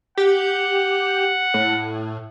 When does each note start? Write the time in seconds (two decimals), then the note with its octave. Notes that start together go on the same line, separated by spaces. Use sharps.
0.17 G4 F#5
1.54 A2